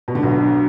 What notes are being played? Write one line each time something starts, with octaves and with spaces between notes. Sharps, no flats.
B2
D3
B1 B2